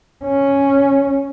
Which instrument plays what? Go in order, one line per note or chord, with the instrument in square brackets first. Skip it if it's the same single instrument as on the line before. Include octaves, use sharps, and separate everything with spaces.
[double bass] C#4